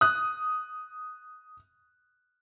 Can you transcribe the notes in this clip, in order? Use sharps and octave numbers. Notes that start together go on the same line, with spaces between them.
D#6 F#6